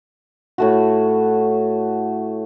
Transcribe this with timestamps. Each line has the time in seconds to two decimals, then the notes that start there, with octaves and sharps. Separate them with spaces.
0.58 A2 A3 F#4